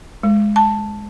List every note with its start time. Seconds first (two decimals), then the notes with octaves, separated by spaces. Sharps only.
0.23 G#3
0.56 A5